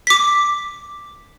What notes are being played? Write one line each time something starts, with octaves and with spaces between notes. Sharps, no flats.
D6 B6